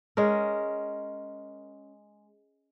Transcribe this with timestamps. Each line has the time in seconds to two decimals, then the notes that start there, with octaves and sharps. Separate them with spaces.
0.17 G#3 C#4 A#4